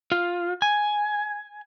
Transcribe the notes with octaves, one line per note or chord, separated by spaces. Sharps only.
F4
G#5